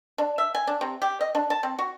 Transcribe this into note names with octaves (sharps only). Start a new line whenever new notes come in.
D4
E5
G#5
D4
C3
G4
D#5
D4
A5
C4
F#4